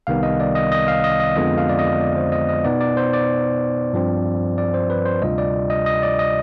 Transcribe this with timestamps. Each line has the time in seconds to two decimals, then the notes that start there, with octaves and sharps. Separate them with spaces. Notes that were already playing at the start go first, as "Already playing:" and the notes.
0.07 C2 C3 D#3 G3 B3 F5
0.23 D#5
0.40 D5
0.55 D#5
0.72 D#5
0.88 F5
1.04 D#5
1.20 D#5
1.35 F2 D3 G#3 B3 F4 D#5
1.58 F5
1.69 D5
1.79 D#5
2.01 D5
2.17 C5
2.32 D#5
2.49 D#5
2.64 B2 B3 D#4 D5
2.81 D5
2.97 C5
3.13 D5
3.93 G2 F3 C4
4.58 D5
4.74 C5
4.90 B4
5.05 C5
5.22 D2 C3 G3 D4 F4 D#5
5.38 D5
5.70 D#5
5.86 D#5
6.03 D5
6.19 D#5